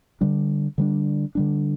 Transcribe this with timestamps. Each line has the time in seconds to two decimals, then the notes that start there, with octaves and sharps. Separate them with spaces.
0.21 D3 G3 D4
0.78 D3 G3 D4
1.35 D3 G3 D4